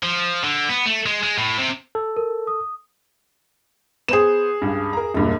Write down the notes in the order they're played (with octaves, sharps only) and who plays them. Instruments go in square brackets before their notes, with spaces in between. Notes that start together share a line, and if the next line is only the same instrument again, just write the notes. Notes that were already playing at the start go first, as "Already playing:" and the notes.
[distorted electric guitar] F3
D3
B3
A3
G#3
G#3
A2
C3
[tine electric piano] A4
[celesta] A#4
D#6
[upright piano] B3 C5 [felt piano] G#4 E7
[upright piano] C#2 G2
A#4 A#5
E1 G2 A#2